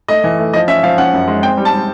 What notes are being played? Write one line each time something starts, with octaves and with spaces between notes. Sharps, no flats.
A3 D#5
E3
A3
F3 D#5
C#4 E5
F3 F5
C#4 F#5
F#2
G#3
C4 G5
G3
A5
G3